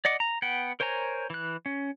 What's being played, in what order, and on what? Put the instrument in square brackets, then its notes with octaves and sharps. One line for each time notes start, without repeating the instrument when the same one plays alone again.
[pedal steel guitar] D5 D#5 F#5 D6
A#5
B3 F#5 G5
A#4 C5 C#5 G#5 A#5
E3 F#6
C#4